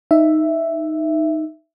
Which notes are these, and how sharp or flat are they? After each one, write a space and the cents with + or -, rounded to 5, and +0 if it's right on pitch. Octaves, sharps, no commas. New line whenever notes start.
D#4 +0 E5 +5